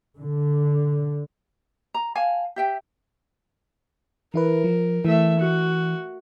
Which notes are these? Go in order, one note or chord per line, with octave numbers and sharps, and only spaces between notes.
D3
A#5
F5 G#5 A5
G4 E5 G5
E3 E4 A#4 B4
F3
E3 A3 E5
F#4